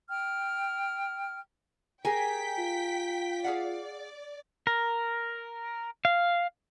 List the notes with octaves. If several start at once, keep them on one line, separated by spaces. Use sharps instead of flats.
G5 F6
G4 G#4 A#4 G5 G#5 B6
F4
G#4 D5 F5 F#5
A#4
F5